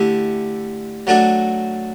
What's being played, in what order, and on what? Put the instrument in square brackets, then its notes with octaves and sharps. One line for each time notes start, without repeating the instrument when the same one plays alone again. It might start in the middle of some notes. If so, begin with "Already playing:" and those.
Already playing: [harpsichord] D3 A3 E4 G4
F#3 A3 D4 F#4